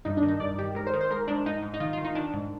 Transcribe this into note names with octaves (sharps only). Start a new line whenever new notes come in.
G2 D#4
D4
D#3
D#4
G2 D5
D#3 G4
G#2 A#4
C5
D#3
C5
G#2 A#4
G#2 D4
G#2 D#4
G#2
D#4
D#3 F4
D#3 F4
D#4
D#3 D4
G#2